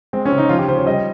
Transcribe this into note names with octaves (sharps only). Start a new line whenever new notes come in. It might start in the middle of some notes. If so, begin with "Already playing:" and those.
G#3 C4
C#4
C#3
D#4
F3 F4
G4
C#3 C5
C#5
G3 D#5